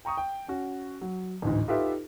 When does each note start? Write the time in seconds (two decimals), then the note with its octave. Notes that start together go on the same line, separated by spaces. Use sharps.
0.05 G5 A#5 C#6 D#6
0.17 G5
0.48 C#4 F#4
1.01 F#3
1.42 A1 D2 G#2
1.68 D#4 F4 G4 A4 B4 E5